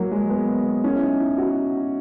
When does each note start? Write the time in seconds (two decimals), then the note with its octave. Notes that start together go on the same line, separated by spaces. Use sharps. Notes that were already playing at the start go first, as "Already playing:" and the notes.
Already playing: F#3 A#3
0.12 G#3
0.29 B3
0.84 C#4
0.96 E4
1.02 D#4
1.20 E4
1.38 F#4